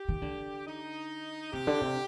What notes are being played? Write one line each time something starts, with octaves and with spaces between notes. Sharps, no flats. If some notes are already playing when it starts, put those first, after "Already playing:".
Already playing: G4
D#3
D3
D#4
C3 G4
D3
C3